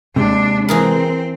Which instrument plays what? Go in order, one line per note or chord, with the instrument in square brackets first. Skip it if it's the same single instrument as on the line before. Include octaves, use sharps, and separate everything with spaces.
[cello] D#2 D4 [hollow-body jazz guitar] C3 G#3
[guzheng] E3 G#4 A#4 [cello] C4